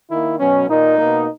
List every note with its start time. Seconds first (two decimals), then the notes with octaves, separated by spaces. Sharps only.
0.09 D#3 A#3 E4
0.38 B2 F#3 B3 C#4
0.68 A#2 A#3 D#4
0.98 B2 A#3